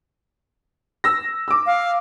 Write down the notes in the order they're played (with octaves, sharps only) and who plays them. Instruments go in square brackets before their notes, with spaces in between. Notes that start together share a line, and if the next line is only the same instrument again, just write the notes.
[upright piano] E6 A#6
D6 E6
[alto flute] F5